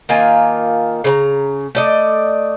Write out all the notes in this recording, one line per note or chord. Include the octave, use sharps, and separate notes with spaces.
D#3 A#3 F4 G#5
C#3 B4 A#5
A3 D5 D#5